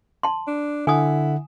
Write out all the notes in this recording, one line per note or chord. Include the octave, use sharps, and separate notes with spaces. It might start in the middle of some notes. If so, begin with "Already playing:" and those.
A5 C6
D4
D3 E4 F#5 G#5 D#6